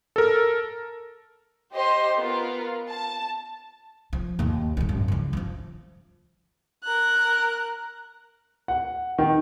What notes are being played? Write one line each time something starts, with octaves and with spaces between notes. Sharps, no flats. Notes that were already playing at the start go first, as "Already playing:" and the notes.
A4 A#4
G4 C5 D#5 C6
B3 F4 A#4
A5
F3
D#2 A#3
G#2 D#3
G#1 F#2
C#2 F3
E3 F3
A#4 F#6
F#5
D#3